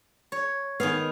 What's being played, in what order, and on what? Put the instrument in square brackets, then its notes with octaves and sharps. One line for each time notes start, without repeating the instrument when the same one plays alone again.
[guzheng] C#5
[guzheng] D#3 G#4 F5 [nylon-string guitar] B3